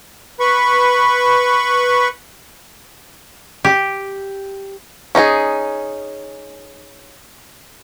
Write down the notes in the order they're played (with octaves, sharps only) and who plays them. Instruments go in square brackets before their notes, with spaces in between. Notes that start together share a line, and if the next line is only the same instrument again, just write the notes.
[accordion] B4 B5 C#6
[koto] G4
[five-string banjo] C#4 D#4 E4 G#4